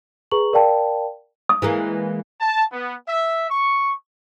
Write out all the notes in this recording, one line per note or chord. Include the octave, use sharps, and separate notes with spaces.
G#4 B4 A#5 C#6 F#7
A#4 D5 F5 G5 A5 B5
D#6
E3 G#3 A#3
A5
B3
E5
C#6